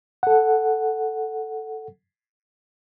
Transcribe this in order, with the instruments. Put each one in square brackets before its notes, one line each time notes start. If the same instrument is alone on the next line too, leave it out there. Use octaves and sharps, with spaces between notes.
[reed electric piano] A4 F#5